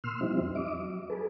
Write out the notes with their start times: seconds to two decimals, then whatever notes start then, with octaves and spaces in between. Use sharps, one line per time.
0.04 A#2 C6 E6 F6
0.21 F3 G3 C4 D#4 E4
0.41 F2
0.55 D#5 E5 D6
0.79 F#3
1.10 G#4 A4 B4